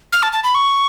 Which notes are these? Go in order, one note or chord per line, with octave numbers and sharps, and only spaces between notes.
F6
A5
A5
B5
C#6